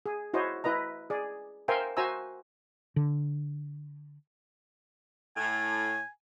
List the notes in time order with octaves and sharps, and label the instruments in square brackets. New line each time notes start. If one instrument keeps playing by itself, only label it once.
[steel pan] G#4
E4 F#4 C5 C#5 D#5
E4 B4 D#5 A#5
G#4 D5
A#4 C5 E5 F5 G5 G#5
F#4 C5 E5 G#5 A#5 E6
[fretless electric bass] D3
[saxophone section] A2 [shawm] G#5